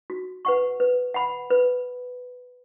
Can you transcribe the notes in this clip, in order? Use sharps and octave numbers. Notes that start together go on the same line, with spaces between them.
F#4
B4 F#5 C#6
B4
F#5 B5
B4